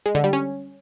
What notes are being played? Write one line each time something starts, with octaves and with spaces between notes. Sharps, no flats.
G#3
D3
G3
C#4